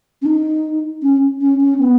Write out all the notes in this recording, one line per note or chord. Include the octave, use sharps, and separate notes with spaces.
C#4
D#4
C#4
C#4
C#4
B3